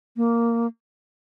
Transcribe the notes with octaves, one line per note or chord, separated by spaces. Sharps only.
A#3